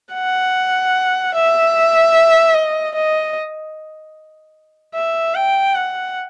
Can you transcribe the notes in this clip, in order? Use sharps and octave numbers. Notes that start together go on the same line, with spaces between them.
F#5
E5
D#5
D#5
E5
G5
F#5